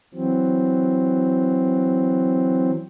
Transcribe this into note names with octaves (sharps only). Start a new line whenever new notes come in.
E3 F#3 C4